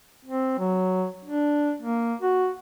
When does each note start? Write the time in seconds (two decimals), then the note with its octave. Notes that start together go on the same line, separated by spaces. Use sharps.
0.25 C4
0.59 F#3
1.25 D4
1.82 A#3
2.21 F#4